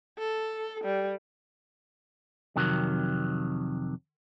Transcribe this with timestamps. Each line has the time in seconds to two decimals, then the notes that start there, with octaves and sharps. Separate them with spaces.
0.18 A4
0.84 G3
2.56 F2 C3 D#3 F#3